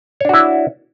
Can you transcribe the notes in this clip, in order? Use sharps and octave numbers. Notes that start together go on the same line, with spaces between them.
D4 E4 F#4 C#5